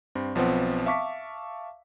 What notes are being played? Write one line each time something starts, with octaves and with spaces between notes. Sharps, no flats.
G2 C4
B1 F3 B3 C4 F#5
E5 F5 A5 C#6 D6 B6